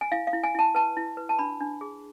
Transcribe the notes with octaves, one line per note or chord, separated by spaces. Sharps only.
G#5
E4 F5
F5
E4
G#5
E4 A5
B4 A5
E4
B4
A5
D4 B5
D4
G#4